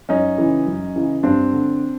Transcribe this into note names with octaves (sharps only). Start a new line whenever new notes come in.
F#2 C#4 D#4
C#3 E3
F#2
C#3 E3
G2 C4 D4
D3